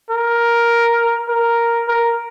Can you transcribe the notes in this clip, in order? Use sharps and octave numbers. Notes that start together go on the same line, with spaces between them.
A#4
A#4
A#4